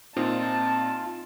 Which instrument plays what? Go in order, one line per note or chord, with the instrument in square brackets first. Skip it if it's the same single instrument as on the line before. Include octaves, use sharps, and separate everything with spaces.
[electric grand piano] A#2 C4 [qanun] D#4 [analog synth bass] F4 [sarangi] A5